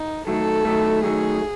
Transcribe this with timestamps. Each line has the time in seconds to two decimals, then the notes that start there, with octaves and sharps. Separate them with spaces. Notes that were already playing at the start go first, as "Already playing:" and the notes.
Already playing: D#4
0.27 D#3 F#3 A3 A4
0.65 D#3 F#3 A3
1.03 D#3 F#3 A3 G#4